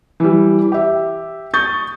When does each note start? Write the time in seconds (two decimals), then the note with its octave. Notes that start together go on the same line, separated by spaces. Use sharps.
0.20 E3 G3
0.72 G4 E5
1.54 C#6 D#6 G6 A6